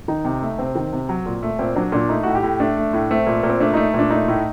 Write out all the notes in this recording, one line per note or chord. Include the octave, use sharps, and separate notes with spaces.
D#3 D#4
C3
A3
C3 C4
D#3
C3
F#3
A#2
A3
A#2 C4
F#3 D4
A#2 D4
A3 D#4
A2 F#4
G4
A2
A3 D4
A3
A2
A3 C4
A#2
A#2
C4
A3 D4
A3 D#4
A#2 D4
A3 D#4
A2